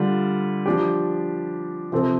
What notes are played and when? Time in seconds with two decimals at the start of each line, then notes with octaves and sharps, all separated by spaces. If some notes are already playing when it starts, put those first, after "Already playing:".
Already playing: D3 G3 F4
0.66 F3 D4 G4
1.92 C3 F3 C4 A4